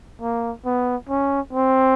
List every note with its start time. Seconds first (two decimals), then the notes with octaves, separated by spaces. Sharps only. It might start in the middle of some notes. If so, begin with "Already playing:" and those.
0.21 A#3
0.65 B3
1.09 C#4
1.53 C4